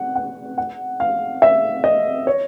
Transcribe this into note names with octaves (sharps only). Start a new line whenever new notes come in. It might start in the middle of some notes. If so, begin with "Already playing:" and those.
Already playing: F#5
F#5
F#5
F5
E5
D#5
C#5